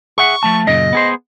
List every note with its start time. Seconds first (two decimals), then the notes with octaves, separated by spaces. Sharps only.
0.18 G#4 E5 F#5 C#6
0.43 F3 A3 A5
0.67 F#2 A#2 C#3 D#5
0.93 B3 G#4 C5